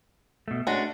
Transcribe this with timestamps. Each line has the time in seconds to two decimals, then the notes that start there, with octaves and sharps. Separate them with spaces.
0.48 B2 A3
0.67 G#3 A3 C#4 D4 F#4